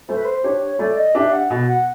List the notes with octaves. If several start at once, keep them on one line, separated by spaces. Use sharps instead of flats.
A3 C5
B4
C5
D4 G4 C#5
A3 D5
D#5
D4 G4 E5
F#5
B2
F#5